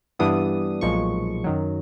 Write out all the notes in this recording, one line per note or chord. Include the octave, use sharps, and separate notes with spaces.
G2 E3 G3 B3 D4 D#6
B1 A#2 F3 G#3 C#6
F#2 D#3 F#3